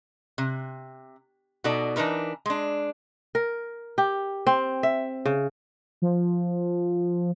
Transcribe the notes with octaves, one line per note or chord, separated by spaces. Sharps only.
C3
B2 B3 D#4 A4 D5
E3 D4 D#4 A#4 B4
G#3 D4
A#4
G4
C4
E5
C#3
F3